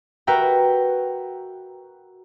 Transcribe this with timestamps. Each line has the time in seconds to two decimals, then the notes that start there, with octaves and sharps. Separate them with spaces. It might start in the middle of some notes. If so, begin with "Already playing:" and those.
0.27 F#4 A#4 B4 E5 G5 A#5